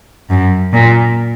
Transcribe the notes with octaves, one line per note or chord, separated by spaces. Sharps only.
F#2
A#2